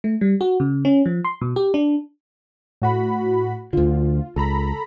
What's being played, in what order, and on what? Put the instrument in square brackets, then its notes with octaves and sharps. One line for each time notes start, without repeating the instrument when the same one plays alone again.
[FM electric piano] A3
G3
F#4
C#3
C#4
F3
C6
B2
G4
D4
[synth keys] A2 F#4 B5
[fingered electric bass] D2 D3 [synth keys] F4
[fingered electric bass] C#2 [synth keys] A4 A#5 B5